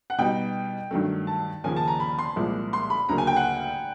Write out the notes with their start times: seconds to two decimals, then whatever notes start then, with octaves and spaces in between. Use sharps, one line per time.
0.10 F#5
0.18 B2 G3 B3 D#4 G5
0.91 G2 D#3 F#3 A3
1.27 A5
1.64 D#2 C#3 F3 A#3 C#4 G#5
1.76 A5
1.88 A#5
2.00 B5
2.19 C6
2.36 C2 A#2 F3 G#3
2.73 C6
2.90 B5
3.09 D2 C#3 F#3 A#3 A#5
3.18 G#5
3.27 G5
3.36 F#5